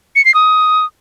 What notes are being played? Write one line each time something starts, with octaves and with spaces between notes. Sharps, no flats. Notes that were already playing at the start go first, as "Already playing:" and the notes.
C#7
C7
D#6